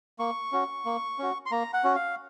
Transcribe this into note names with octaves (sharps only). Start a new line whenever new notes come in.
A#3 C#6
C#4 F#4
A#3
C#4 F#4
C6
A#3 A#5
F#5
C#4 F#4
F5